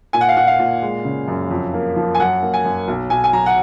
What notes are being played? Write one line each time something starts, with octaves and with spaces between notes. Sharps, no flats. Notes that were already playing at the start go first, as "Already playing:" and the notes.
A#2 G#5
F#5
F5
A#2 F#5
F5
A#2
G#3
C#3
F#2
F2
A#3
F3
G#5
F#2 F#5
A#3
G#5
F#2
B1
B1 G#5
G#5
F#3 A#5
F#5